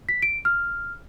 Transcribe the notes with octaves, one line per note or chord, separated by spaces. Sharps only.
B6
D7
F6